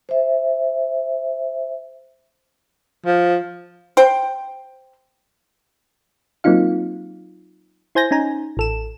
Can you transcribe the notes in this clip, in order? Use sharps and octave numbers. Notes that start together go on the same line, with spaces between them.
C5 E5
F3
C5 G5
F#3 A#3 C4 D#4 F4 F5
E4 C5 G#5 G6 A#6
C#4 D#4 G#5 A#5
A1 A4 E7